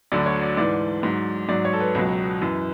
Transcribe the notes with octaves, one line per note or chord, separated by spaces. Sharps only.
D2 D3 F#3 D5
C#5
D5
G#2 E3 D5
G#2 F#3
G#2 F#3 D5
C#5
A4
B4
C#2 B2 F#3
F#2 E3